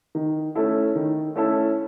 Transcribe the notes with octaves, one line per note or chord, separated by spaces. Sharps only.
D#3
A3 C#4 E4 A4
D#3
A3 C#4 E4 A4